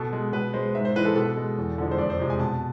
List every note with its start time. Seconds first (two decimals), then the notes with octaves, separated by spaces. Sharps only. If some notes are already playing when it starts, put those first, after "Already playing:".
Already playing: B2 A4
0.13 G#3
0.33 B2 B4
0.53 G#3 C5
0.75 G#2 E5
0.85 C5
0.95 E3 G#3 B4
1.05 A4
1.16 B2 A4
1.37 G#3
1.58 E2
1.78 D3 F3 G#3
1.91 C5
1.98 F2 D5
2.10 C5
2.19 C3 F3 G#3
2.30 G#5
2.40 B2 A5